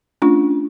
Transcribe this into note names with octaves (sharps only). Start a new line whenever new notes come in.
A3 C#4 D4 F4